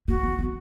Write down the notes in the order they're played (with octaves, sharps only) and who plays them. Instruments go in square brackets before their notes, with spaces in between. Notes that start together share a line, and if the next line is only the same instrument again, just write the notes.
[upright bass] A#3 [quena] F#4
[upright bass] B3
B3